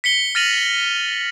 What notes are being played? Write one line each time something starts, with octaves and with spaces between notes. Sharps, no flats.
B6 C#7 G7
F6 A6 A#6 D#7 F7 F#7